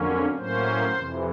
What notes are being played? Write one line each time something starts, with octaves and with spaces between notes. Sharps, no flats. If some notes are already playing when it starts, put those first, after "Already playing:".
Already playing: F2 D3 F#3 A#3 C#4
A2 F#3 A#3 C#4 C5
F2 C3 E3